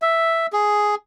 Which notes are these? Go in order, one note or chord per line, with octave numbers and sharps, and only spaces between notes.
E5
G#4